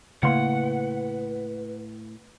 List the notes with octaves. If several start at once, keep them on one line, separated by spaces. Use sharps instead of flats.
A2 C#3 A#3 B4 F5 F#5 C6